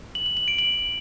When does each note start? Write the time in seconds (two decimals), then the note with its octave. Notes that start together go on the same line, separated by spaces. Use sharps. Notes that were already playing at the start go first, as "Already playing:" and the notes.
0.15 F#7
0.26 F#7
0.37 F#7
0.48 D7
0.59 F#7